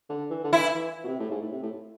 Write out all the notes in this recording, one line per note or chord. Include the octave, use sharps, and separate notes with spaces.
D3
E3
D3
E3 E4
E3
B2
C3
A2
G#2
A2
C3
A2